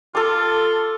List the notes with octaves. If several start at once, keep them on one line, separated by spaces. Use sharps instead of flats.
F4 A4 D6